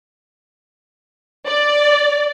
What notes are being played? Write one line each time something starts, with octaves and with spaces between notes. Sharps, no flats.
D5